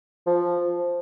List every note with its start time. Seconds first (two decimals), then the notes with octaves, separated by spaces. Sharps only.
0.27 F3